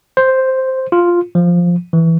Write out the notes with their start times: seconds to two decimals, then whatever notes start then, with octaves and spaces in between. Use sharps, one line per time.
0.17 C5
0.92 F4
1.35 F3
1.93 E3